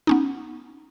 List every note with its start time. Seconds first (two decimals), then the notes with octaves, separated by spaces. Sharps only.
0.07 B3 C#4 D#4